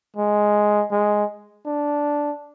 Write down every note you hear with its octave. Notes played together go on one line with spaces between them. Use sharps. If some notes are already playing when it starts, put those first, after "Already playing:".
G#3
G#3
D4